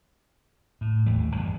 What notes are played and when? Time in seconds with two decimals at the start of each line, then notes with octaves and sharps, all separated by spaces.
0.81 A2
1.06 G#1 D#2 E3 A3
1.37 F#2 B2 E3 G3